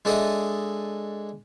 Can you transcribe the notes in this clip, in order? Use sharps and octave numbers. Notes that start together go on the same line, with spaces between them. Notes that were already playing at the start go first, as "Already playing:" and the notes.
G#3 D4 A4 D#5 E5 D#6